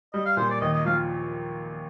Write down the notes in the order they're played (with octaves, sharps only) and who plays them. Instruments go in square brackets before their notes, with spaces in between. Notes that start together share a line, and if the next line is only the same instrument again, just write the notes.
[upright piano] G3 [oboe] D#5
[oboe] F5
[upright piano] A#2 [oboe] C5
[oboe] D5
[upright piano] D#2 [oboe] D#5
[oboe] D#5
[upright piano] F3 [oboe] F5